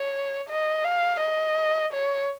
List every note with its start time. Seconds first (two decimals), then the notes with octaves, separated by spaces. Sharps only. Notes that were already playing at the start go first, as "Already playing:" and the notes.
Already playing: C#5
0.49 D#5
0.84 F5
1.20 D#5
1.93 C#5